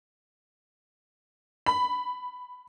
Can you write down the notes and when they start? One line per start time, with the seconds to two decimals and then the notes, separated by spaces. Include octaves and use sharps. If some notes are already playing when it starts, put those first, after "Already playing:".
1.66 B5